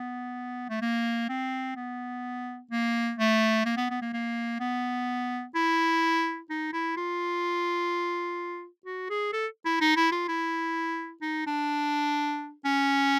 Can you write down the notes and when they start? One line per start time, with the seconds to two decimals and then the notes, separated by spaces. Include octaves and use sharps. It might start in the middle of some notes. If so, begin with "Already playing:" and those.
Already playing: B3
0.70 A3
0.82 A#3
1.29 C4
1.76 B3
2.71 A#3
3.19 A3
3.66 A#3
3.77 B3
3.90 B3
4.02 A#3
4.13 A#3
4.60 B3
5.55 E4
6.50 D#4
6.73 E4
6.97 F4
8.86 F#4
9.10 G#4
9.33 A4
9.65 E4
9.81 D#4
9.97 E4
10.12 F4
10.28 E4
11.22 D#4
11.47 D4
12.65 C#4